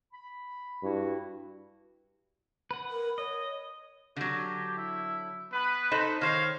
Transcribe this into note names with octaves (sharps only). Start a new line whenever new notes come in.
B5
G2 E4 F#4
B4 F#5
A#4
C#5 D#5
D3 F#3 G4
E4
B3 B4
D#4 A4 C5 B5
D#3 C5 C#5 F5